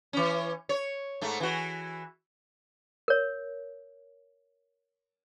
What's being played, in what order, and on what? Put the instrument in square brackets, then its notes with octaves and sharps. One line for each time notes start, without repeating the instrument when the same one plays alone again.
[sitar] E3 C#4
C#5
G#2 A3
E3 F#4
[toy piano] A#4 C#5